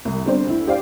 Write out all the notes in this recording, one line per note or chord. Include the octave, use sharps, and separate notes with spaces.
C2
D3 G3 B3 C4 D4 C5
D2 E4
G4 C5 D5 F5